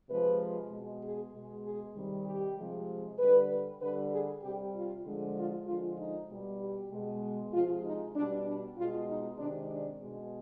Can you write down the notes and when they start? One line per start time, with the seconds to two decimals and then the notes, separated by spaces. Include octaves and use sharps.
0.09 C3 F3 G#3 B4
0.71 B2 G#3
1.02 G#4
1.33 B2 G#3
1.64 G#4
1.95 C3 D#3 G3
2.26 G4
2.57 C3 F3 G#3
3.18 D3 G3 B4
3.81 D3 G3 B4
4.12 G#4
4.42 C3 G3 G4
4.74 F4
5.05 D3 F3 G#3
5.36 F4
5.67 D3 F3 G#3 F4
5.98 D#4
6.29 B2 G3
6.60 G4
6.91 B2 G#3
7.52 C3 F3 G#3 F4
7.84 D#4
8.15 B2 G3 D4
8.45 D4
8.77 B2 G#3 F4
9.08 D#4
9.38 C3 D#3 G#3 D4
9.69 D4
10.01 B2 G#3